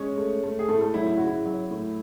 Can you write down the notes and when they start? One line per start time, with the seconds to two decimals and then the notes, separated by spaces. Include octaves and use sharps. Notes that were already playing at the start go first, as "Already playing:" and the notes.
Already playing: G#3 C#4 C#5
0.18 A3
0.44 A3
0.59 G#4
0.68 A2 A3 A4
0.81 A3 A4
0.94 F#3 E4
1.07 E4
1.18 C#3 F#4
1.27 E4
1.45 F#3
1.71 A2